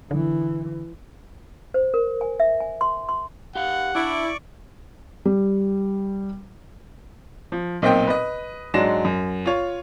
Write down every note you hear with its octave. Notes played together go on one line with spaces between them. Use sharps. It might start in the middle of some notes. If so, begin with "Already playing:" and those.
D3 E3
C5
A#4
G#5
E5
G#5
C6
C6
G4 F5 F#5
D4 E4 D5 C#6 D6
G3
F3
B1 A#2 C4 D#5 G5
B4 D#5
G#2 F#3 G#3 D4 A#6 E7
F#2
F4 C#5